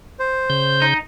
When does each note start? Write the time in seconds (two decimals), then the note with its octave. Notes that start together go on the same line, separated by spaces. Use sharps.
0.19 C5
0.50 C#3 G6
0.82 D#4